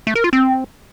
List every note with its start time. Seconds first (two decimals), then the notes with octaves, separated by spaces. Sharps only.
0.07 A3
0.15 A#4
0.24 F4
0.33 C4